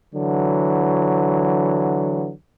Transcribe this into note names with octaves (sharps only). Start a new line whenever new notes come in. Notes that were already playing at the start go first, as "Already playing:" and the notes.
D3 E3 F#3